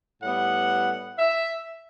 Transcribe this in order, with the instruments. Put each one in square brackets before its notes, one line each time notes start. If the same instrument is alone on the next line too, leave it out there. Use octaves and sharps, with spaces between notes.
[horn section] A2 G3 B3 F#5
E5